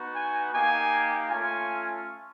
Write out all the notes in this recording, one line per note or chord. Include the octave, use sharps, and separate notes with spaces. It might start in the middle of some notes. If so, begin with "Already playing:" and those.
Already playing: B3 D#4 F#4
G#5
A#3 D#4 G4 G#5
A3 C#4 F4 G#5